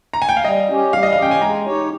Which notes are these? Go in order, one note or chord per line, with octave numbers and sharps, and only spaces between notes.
A#5
G#5
G5
F5
G3 D#5
C#4 G4
G3 F5
D#5
F5
C#4 G4 G5
G#5
G#3 A#5
D#4 G4 C#5